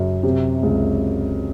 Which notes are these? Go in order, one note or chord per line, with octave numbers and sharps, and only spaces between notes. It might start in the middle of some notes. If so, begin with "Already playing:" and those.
Already playing: F#2 C#3
C3
C#2